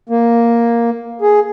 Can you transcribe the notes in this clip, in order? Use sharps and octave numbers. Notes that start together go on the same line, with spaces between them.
A#3
G#4